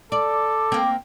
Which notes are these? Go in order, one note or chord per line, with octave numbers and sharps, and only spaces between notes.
A4 D5 D6
A#3 C4